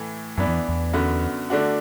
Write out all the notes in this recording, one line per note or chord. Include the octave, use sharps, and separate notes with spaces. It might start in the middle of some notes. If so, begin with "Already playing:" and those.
Already playing: A2 E3 A3
F#2 E3 B3 D4
E2
E2
F#2 D3 B3 F#4
D3 A3 D4 F#4